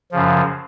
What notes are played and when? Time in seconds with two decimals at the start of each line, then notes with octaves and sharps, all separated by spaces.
0.11 F#2 C#3 F3